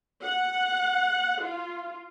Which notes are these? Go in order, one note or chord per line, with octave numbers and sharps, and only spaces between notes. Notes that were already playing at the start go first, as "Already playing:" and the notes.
F#5
F4